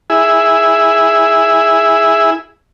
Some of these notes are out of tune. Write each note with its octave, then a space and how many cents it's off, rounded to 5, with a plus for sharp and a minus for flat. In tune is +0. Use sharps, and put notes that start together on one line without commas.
E4 +0 G#4 -5